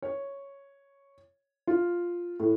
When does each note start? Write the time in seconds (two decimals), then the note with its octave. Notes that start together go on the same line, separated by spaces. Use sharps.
0.02 C#5
1.67 F4
2.40 A2